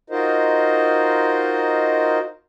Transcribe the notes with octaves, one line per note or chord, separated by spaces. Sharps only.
D#4 F4 F#4 A#4 C5 D#5